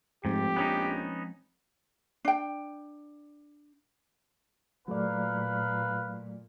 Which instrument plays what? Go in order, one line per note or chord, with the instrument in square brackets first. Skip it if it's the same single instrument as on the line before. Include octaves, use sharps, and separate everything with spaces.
[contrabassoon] F1 [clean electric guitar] G#2 [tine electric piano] F3 G#3 C4 [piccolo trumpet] G4
[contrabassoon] A#1 [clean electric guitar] B3 C#4 D#4
[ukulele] D4 G5
[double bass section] A#2 [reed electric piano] F#3 A3 D5 [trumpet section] A#4 B4 F5